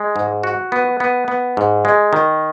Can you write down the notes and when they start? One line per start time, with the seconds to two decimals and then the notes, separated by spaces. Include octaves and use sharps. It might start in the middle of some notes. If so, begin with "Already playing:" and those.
Already playing: G#3
0.16 G#2
0.43 F#4
0.72 B3
1.00 B3
1.28 B3
1.57 G#2
1.85 G#3
2.13 D#3